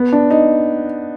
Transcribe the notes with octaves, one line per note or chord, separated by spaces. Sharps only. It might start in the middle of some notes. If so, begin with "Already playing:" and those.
Already playing: B3
D4
D#4